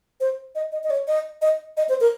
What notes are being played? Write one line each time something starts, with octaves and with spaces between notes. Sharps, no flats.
C5
D#5
D#5
D#5
C#5
D#5
D#5
D#5
C5
A#4